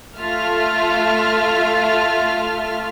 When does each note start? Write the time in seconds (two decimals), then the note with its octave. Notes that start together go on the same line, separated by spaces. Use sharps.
0.18 A3 F4 E5 F6